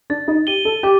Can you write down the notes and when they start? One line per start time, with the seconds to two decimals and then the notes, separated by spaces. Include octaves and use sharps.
0.10 D4 A6
0.28 D#4
0.47 G4 D#7 G7
0.65 A4
0.83 G4 D6